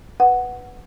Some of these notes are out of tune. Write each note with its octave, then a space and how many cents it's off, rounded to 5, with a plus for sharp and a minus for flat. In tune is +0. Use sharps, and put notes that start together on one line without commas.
B4 +0 F#5 +0